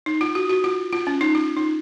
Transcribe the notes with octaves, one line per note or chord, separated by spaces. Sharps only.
D#4
F4
F#4
F#4
F4
F4
C#4
D#4
F4
D#4